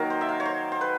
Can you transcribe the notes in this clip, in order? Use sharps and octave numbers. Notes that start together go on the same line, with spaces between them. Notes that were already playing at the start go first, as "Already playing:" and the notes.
Already playing: D#3 F#3 A#3 A#4
C5
E5
F5
C#5
C5
C5
B4